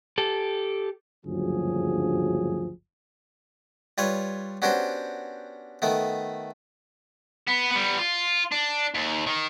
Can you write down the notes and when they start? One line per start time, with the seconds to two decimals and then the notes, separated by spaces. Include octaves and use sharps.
0.18 G4 A4
1.26 F#1 D2 G2 F3 F#3 G#4
3.98 G3 F4 B4 C#5
4.62 B3 C#4 D4 F#4 G4 C5
5.82 D#3 A3 B3
7.48 B3
7.71 G3 B3
7.98 F4
8.52 D4
8.94 D#2
9.26 D#3